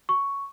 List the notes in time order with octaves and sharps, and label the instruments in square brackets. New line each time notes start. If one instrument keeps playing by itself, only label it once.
[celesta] C#6